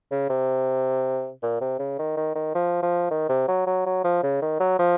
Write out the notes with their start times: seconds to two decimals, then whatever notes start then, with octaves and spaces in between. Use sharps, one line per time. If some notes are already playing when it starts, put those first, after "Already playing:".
0.11 C#3
0.30 C3
1.42 A#2
1.61 C3
1.79 C#3
1.99 D#3
2.17 D#3
2.35 D#3
2.55 F3
2.82 F3
3.10 D#3
3.29 C3
3.48 F#3
3.67 F#3
3.86 F#3
4.04 F3
4.23 C#3
4.42 D#3
4.60 F#3
4.79 F3